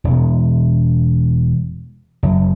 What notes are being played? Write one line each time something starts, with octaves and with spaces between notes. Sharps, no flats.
E1 B2
F#1